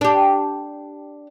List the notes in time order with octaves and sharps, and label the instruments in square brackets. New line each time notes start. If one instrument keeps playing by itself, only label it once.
[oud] D4 G4